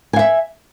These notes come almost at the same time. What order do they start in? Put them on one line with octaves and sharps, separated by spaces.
G#5 F5 E5